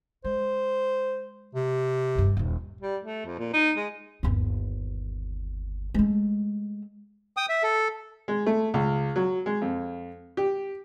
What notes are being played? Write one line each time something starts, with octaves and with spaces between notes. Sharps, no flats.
G#3 C5
C3
F#1 G2
D#1 D#2
G3
A3
F2
A#2
D#4
G#3
G1 D#2
G#3 A3
G5 D#6
E5
A4
G#3
A3
C#2
F#3
G#3
F2
G4